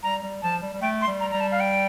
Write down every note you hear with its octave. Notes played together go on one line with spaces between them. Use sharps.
G3 A#5
G3
F3 A5
G3
G3
A3 G5
C6
G3
A#5
G3 A#5
A5
F5
G5